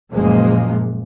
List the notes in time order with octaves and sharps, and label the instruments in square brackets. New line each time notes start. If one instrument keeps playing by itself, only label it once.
[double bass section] F#1 A#2 F3 G#3 A#3